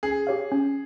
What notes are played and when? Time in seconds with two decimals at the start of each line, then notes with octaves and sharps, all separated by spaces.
0.03 C#4 G#4
0.27 G4 C#5 F5
0.52 C#4